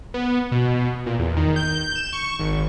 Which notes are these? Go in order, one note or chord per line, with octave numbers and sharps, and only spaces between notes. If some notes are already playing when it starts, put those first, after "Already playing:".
B3
B2
A#2
E2
D#3
G6
E7
C#6
G#1